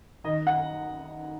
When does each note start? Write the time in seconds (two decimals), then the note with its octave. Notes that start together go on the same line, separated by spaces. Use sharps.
0.24 D#3 D#5
0.47 F#5